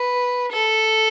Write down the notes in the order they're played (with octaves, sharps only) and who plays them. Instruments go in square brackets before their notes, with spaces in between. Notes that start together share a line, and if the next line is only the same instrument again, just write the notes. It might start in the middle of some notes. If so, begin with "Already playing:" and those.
Already playing: [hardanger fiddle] B4
A4